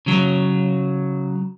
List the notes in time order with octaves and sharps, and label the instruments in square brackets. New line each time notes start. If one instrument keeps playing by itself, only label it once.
[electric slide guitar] C#3 F#3